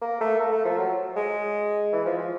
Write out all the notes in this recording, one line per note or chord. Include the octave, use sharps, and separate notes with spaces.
A#3
A3
A#3
A3
F3
F#3
G#3
E3
F3
F3